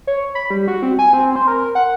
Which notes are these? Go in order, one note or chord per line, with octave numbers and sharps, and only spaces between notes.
C#5
B5
G3
F#4
C4
G#5
C4
C5
A#4
F#5